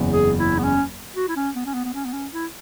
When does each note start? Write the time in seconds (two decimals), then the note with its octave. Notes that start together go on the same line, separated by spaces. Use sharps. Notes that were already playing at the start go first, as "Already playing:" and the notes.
Already playing: F#1 E2 C#3 G#3
0.13 G#4
0.38 E4
0.58 B3
0.64 C#4
1.16 F#4
1.29 E4
1.36 C#4
1.55 B3
1.66 C#4
1.74 B3
1.84 B3
1.94 C#4
2.05 B3
2.13 C#4
2.32 E4